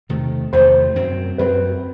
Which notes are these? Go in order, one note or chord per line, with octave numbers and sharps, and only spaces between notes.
E2 C3 D#3 A3
E2 C3 D#3 A3 C5
F#2 F#3 C4
F#2 F#3 C4 B4